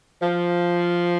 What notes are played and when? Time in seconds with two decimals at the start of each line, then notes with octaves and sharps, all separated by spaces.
0.21 F3